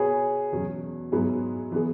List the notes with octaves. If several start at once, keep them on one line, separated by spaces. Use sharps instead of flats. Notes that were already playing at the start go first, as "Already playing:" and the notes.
Already playing: B2 B3 F#4 G#4 B4 C#5
E2 B2 F#3 C#4
G#2 F#3 B3 E4 G#4
E3 B3 G#4